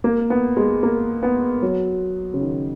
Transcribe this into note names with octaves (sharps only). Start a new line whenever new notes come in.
A#3
B3
G#3
A#3
B3
F#3
C#3
D#3